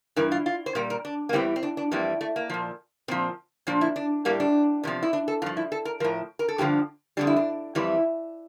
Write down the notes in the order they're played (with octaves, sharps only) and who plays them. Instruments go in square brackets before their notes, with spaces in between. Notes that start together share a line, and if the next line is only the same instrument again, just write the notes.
[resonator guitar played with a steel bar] G2 E3 A#4
F4
F4
C5
A#2 G3 A#4
A#4
D4
A#3
E2 E3 G3 C4
C4
D4
D4
F2 E3 G3 A#3
A3
A#3
A#2 F3
A#2 F3 C4
A#2 F3 D4
E4
D4
A2 G3 A#3
D4
E2 C3 F3
E4
D4
A4
G2 F3 F4
E4
A4
A#4
A2 F3 A#4
A#4
A4
G2 D3 F3 G4
F2 D3 G3 D4
E4
D4
F2 E3 G3 E4